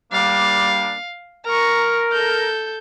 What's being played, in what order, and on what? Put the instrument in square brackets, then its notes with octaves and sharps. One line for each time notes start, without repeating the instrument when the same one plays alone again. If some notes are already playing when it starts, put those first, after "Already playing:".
[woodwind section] G3 A#3 D4 [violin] F5
[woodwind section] A#4 [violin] A#5 C#6
[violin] A4 G6